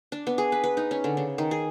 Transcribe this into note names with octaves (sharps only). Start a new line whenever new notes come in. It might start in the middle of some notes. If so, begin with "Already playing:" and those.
D4
B3
G#4
B4
B4
D#4
C#4
D3
C#3
D#3
G#4